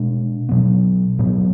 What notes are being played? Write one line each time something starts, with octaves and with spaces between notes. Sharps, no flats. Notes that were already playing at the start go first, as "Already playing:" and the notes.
Already playing: B2 G#3 D4
B2 F#3 B3
A2 F#3 B3